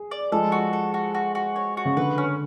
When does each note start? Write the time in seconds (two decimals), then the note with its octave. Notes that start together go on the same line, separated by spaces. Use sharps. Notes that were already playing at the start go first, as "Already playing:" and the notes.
Already playing: G#4
0.11 D5
0.32 F3 G#3 A4
0.52 F#4
0.73 A4
0.94 F#4
1.15 F#4
1.35 F#4
1.56 C#5
1.77 F#4
1.85 C#3
1.97 D3 B4
2.18 C#4